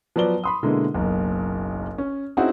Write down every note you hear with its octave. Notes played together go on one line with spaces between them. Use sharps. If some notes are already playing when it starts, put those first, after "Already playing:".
F3 F#3 B3 D5 G7
B5 C6 D#6
B2 D3 G#3 A#3 E4
F#1 B1 A#3
C#4
C4 C#4 D#4 E4 F#4 G#4